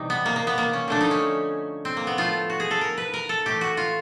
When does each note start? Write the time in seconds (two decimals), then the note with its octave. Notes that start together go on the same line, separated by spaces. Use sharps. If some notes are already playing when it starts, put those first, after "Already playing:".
Already playing: C3 E3 G3 D#4
0.10 B3
0.26 A#3
0.36 A#3
0.47 B3
0.58 A#3
0.73 C#4
0.88 D3 F3 A3 D4
1.01 D#4
1.11 C#4
1.85 C4
1.97 A#3
2.07 B3
2.17 A2 F3 A3 F4
2.50 F#4
2.60 G#4
2.71 A4
2.81 A#4
2.98 B4
3.14 A#4
3.29 A4
3.46 A2 E3 A3 G4
3.61 F#4
3.77 F4